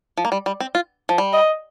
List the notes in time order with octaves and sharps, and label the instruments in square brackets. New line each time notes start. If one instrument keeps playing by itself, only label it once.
[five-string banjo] F3
A#3
G3
G3
C4
F4
F3
G3
[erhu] D#5